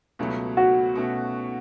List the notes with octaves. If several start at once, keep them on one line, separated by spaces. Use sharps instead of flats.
C#2 B2 F#3 A3
F#4
B2 A3 C#4